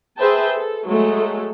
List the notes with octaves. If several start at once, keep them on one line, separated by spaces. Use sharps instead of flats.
G#4 B4 C5 E5 G5 A5
A4
F#3 G#3 A3 A4